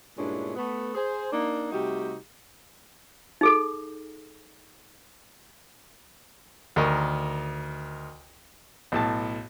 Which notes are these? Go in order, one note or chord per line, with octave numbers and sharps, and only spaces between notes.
G2 A#2 G#3 C#4 D4 E4
A3 B3 B4
G#4 C5
A#3 D4 D#4
C3 G3 A3 D#4 F#4 G4
D#4 G#4 A4
D2 D#3 A#4 D#5 C#6
B1 A2 A5